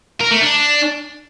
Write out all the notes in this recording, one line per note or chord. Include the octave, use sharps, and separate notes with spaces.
A#4
A3
D4